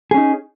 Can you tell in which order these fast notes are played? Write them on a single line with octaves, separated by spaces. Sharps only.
G#4 C#4 D#4